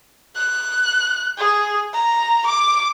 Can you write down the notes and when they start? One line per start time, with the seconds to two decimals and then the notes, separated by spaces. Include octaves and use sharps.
0.36 F#6
1.38 G#4
1.93 A#5
2.46 D6